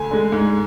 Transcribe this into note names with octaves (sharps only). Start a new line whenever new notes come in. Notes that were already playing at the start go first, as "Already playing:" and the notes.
Already playing: D2 G#5
D3 G#3
G#2